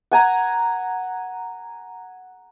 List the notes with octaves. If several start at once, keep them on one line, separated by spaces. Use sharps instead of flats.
F#5 G#5 A#5